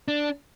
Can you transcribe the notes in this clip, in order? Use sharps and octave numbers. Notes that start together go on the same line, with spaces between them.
D4